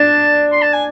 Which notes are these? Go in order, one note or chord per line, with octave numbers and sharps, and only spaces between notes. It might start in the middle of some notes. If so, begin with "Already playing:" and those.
Already playing: D4 A5
C6
A5
G#5